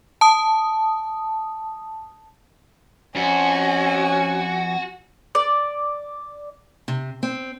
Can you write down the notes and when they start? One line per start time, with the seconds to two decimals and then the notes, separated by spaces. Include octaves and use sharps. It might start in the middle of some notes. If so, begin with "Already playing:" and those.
0.21 A5 D#6
3.16 F2 C#4 F#4 G#5
5.35 D5
6.88 C3
7.23 C4